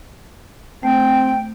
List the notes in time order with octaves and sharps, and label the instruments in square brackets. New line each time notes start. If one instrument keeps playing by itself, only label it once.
[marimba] A3 [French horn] C4 [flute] G5